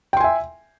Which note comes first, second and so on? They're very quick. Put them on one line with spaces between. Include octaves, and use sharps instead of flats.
G5 C6 G#5 E5